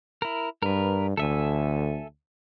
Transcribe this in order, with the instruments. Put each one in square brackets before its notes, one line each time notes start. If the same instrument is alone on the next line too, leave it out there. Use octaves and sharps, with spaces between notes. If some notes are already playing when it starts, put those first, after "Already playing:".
[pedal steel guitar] E4 A#4
[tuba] G2 [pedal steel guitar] A#4 B4
[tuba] D2 [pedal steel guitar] A4 E5 G#5